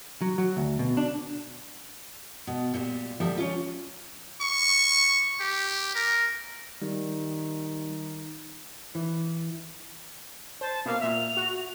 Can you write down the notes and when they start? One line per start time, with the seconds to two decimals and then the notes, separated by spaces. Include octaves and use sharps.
0.22 F#3
0.38 F#3
0.57 D2
0.79 B2
0.97 D4
2.47 B2
2.74 A#2 G3
3.20 D2 F3 G3 E5
3.38 C#4 F4
4.41 C#6
5.40 G4
5.95 A#4
6.82 D#3 G3
8.95 E3
10.61 C5 A5
10.86 B2 A#3 F5
11.01 A#2 E5 F7
11.37 F#4